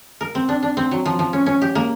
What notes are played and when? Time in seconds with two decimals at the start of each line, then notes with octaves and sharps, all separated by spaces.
0.21 A#4
0.35 C4
0.49 D4
0.63 D4
0.77 C4
0.91 F#3
1.06 F3
1.19 F3
1.33 C#4
1.46 C#4
1.62 G4
1.75 A#3